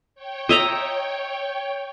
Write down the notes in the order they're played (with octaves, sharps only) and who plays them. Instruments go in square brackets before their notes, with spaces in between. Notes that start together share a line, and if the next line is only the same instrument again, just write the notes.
[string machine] C#5 G5
[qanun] D#5 E5 A#5